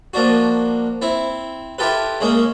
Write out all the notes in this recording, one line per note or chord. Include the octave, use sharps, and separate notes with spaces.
F3 A#3 D4 F#4
C4 E4
E4 F4 G4 A4 B4
C#3 G#3 A#3 C#4